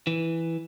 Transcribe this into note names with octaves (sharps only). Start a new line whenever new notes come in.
E3